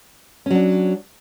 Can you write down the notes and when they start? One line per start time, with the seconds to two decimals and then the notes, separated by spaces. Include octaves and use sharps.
0.46 C#4
0.51 F#3
0.55 D4